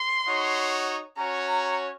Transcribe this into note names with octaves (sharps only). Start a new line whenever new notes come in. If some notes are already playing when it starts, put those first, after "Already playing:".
Already playing: C6
D#4 F#4 C#5
C#4 F#4 C#5 A#5
A#5